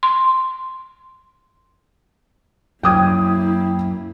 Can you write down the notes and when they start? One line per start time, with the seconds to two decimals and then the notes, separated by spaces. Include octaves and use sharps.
0.03 C6
2.83 F#2 F#3 A#3 E4 G5 D#6 G#6